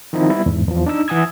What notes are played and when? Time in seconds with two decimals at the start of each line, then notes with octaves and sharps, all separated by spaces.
0.13 D#3 F3 C4 D#4 E4
0.30 G3 B3 E4
0.46 E2 G#2
0.68 E2 F3
0.86 D4 D#4 E6
1.08 E3 F#5 G#5 D#6 E6 G#6